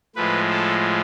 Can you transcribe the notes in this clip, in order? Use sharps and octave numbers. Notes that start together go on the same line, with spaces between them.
A2 F3 G#3 B4
A4